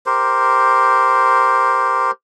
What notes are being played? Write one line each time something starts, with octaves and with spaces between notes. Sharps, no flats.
G4 A#4 C5